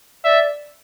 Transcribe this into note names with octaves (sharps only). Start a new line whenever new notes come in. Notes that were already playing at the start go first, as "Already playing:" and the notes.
D5 E5